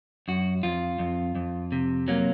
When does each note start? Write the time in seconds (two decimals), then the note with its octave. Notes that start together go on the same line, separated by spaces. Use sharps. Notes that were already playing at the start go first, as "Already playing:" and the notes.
0.28 F#2 F#4
0.63 F2 F4
0.99 F2
1.35 F2
1.72 C3
2.08 F#3 A#3